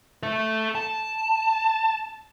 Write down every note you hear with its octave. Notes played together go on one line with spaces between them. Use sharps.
A4 E5
A5